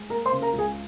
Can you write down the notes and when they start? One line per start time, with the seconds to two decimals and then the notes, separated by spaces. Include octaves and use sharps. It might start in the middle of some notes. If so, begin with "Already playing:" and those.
Already playing: G#3
0.09 A#3 A#4 A#5
0.26 C5 C6
0.32 C#3
0.42 A#4 A#5
0.53 C#2
0.58 G#4 G#5